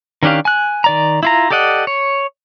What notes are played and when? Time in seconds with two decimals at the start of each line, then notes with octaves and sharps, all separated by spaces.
0.23 D#3 C#4 D4 G4 F5
0.45 G#5 F#6
0.84 D#3 D5 A#5
1.23 E4 F4 A#5
1.50 G4 A4 D5 D#5 F#5
1.87 C#5